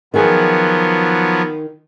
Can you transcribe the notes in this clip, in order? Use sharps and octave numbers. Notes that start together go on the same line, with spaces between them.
D#3 F3 F#3 B3 G#4